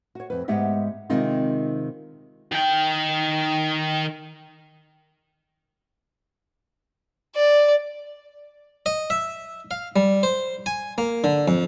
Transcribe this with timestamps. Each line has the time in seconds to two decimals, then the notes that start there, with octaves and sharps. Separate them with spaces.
0.15 F#4 C#5
0.30 F2 B4
0.48 G#2 G#3 B3 G4 E5 F#5
1.10 C3 D#3 G#3 C4 D#4 F4
2.52 D#3 G5
7.36 D5
8.86 D#5
9.10 E5
9.71 F5
9.96 G3
10.23 C5
10.66 G#5
10.98 A#3
11.24 D3
11.48 F2